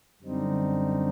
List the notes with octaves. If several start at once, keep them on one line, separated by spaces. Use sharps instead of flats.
F#2 D3 G3 C4 D#4